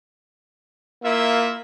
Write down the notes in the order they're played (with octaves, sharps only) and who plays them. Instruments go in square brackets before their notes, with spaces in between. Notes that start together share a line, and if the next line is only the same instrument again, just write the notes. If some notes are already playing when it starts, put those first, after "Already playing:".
[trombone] A#3 [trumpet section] E4 F4 E5